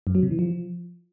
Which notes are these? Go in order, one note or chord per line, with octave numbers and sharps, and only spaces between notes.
F#2
F#3
C3
E3
F3